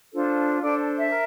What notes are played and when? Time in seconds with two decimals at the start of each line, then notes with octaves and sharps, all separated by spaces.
0.14 D4 F4 A4 C5
0.62 D4 A4 C5 D5
0.98 E5
1.11 A#4